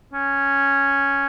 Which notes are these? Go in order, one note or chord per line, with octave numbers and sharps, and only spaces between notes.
C#4